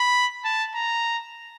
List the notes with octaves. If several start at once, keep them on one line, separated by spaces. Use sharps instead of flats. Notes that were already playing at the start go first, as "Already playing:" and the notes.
Already playing: B5
A5
A#5